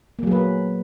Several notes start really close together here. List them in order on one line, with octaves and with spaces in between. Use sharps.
A#3 F#3 G#4 B4